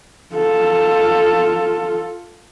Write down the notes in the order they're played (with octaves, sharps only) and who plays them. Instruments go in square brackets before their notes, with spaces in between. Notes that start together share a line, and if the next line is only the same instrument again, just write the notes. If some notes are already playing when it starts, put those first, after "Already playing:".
[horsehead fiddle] F4 A4